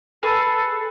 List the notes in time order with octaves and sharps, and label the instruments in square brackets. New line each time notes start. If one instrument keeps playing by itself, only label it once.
[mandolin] G#4 B4 [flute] A4